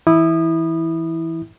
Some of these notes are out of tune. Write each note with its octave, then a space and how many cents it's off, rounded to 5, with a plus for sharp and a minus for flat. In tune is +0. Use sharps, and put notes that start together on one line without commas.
E3 +0 E4 -15 D#6 -25